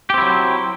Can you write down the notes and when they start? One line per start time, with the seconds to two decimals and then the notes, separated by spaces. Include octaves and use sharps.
0.10 G4
0.14 C4
0.18 E4
0.22 F#3